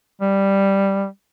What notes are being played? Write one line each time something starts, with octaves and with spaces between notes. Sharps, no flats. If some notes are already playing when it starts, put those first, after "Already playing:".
G3